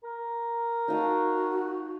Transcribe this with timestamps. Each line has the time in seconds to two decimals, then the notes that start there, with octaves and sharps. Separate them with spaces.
0.04 A#4
0.88 D#4 F#4 F5 A5